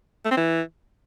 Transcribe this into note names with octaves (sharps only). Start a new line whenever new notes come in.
A3
C4
E3